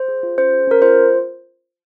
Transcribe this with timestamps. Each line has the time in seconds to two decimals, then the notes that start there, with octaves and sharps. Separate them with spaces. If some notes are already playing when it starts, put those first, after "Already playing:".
Already playing: C5
0.08 G#4
0.23 F4
0.38 C#4 C5
0.53 G#4
0.67 C#4 A#4
0.82 F4 C5